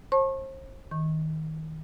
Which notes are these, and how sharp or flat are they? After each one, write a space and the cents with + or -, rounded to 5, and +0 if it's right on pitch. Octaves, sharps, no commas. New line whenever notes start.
C5 +40 A5 -5 C#6 -35
D#3 +20 C#6 -25